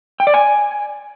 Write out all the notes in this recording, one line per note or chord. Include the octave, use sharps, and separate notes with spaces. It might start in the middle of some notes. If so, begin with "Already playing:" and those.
G5
D5
G#5